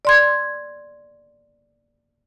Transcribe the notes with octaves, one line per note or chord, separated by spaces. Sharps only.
D5 C6 G#6